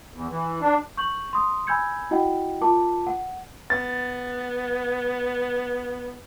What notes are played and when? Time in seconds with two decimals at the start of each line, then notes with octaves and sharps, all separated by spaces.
0.14 E2
0.29 E3
0.61 D4
0.97 C#6 G6 F#7
1.33 C6 D#6
1.67 G#5 B5 E6 G6 G#6 C#7
2.11 E4 F#4 D#5 F#5 G5
2.61 F4 A#4 A5 D6
3.07 F#5
3.70 B3 A6